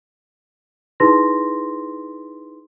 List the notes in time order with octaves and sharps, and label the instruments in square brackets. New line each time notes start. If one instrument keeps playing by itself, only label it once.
[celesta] D#4 E4 G#4 B4 C6 A#6